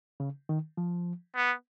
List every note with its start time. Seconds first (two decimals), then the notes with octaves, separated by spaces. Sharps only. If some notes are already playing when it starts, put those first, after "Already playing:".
0.20 C#3
0.49 D#3
0.77 F3
1.36 B3